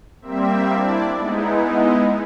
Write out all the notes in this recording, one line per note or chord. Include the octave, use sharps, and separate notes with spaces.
G3 A#3 C4 E5
D4 E4 D5
G#3 B3 D#4 E4